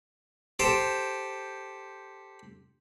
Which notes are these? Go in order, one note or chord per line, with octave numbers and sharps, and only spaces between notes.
G4 A4 C5